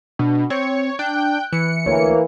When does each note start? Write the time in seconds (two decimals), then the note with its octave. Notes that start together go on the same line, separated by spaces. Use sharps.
0.19 B2 D4
0.50 C4 C#5 C#7
0.99 D4 G5 F#6
1.53 E3 C#7
1.86 D2 E3 A#3 C#5